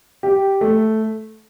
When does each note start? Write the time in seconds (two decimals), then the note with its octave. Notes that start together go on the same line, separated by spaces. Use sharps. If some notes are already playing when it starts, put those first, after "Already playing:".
0.23 G4
0.61 A3